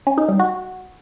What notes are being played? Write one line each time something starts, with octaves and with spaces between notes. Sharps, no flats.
C#4
D#4
G3
F#4